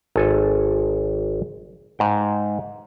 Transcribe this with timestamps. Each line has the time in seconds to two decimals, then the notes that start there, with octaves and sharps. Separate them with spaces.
0.16 G#1 A4 G#5
1.99 G#2 G5